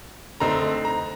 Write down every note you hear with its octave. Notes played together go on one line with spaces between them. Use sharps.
D3 A3 C4 D#4 A#5
A#5